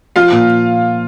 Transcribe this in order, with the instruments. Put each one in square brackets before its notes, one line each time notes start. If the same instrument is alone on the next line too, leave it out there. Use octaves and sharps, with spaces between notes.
[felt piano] F3 [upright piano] F4 F5
[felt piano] A#2